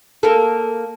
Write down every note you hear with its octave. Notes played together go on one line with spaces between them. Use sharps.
A#3 A4